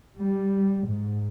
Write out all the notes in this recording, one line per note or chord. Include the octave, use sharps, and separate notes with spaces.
G3
G#2